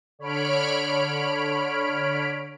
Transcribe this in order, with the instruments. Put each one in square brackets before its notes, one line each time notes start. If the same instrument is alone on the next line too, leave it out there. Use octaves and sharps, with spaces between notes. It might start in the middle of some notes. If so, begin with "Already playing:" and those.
[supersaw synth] D3 C#5 B5 F6 D7